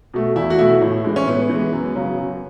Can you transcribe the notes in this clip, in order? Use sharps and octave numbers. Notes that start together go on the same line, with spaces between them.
B2 A3
E2 E4
F#4
B2 A3 E4
A2
E3 G#3
C#4
A2 B3
E3
G#3
F#2
C#3 F#3
F#2